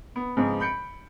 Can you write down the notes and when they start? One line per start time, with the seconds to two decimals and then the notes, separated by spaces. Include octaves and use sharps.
0.16 B3
0.37 G#2 C#3 F3 B3 C4
0.60 B5 G6 C#7 D7